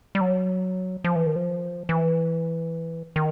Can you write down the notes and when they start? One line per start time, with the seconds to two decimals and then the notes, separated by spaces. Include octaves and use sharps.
0.15 G3
0.21 F#3
1.04 F3
1.16 E3
1.26 D#3
1.36 F3
1.89 E3
3.16 D#3